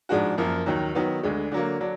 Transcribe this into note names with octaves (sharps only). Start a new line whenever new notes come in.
G#2 F3 G#3 D4 F#4
F#2 F3 A#3
D#2 D#3 F#3
D#3 F#3 B3
D2 D3 G#3
D3 F#3 A#3
D3 F#3 D4